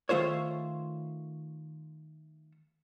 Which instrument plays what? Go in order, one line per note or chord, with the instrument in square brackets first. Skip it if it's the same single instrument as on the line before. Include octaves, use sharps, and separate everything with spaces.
[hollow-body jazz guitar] D#3 A3 F4 C5 C#5